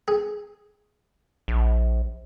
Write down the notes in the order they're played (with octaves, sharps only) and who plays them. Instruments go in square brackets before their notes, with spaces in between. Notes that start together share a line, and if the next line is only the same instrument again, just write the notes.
[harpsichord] G#4
[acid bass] A#1